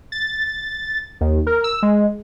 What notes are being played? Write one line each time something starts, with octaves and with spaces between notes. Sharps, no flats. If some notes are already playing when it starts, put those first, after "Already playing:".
A6
D#2
A#4
E6
G#3